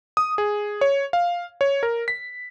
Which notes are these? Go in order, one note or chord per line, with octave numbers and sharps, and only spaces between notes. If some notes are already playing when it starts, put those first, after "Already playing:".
D#6
G#4
C#5
F5
C#5
A#4
B6